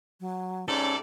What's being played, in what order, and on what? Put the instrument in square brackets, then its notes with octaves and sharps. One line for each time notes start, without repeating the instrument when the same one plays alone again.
[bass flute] F#3
[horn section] G#2 C3 D5 [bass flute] C#4 [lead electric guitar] A4